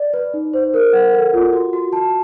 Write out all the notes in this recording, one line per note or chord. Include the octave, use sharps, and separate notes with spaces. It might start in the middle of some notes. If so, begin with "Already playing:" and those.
Already playing: D5
B4
D#4
C5
A#4
F#5
A4
F4
F#4
F#4
A5